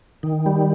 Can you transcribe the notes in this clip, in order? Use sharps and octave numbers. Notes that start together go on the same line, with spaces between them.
D#3
G3